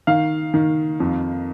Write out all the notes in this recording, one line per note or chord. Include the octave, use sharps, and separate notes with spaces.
D#3 F5
D#3
F2